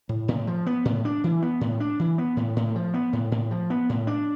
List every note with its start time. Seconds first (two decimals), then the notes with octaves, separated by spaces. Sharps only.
0.09 A2
0.28 A2
0.47 F3
0.66 B3
0.85 A2
1.05 D4
1.24 E3
1.42 B3
1.61 A2
1.80 D4
1.99 E3
2.18 B3
2.37 A2
2.56 A2
2.75 F3
2.94 B3
3.13 A2
3.32 A2
3.51 F3
3.70 B3
3.89 A2
4.07 D4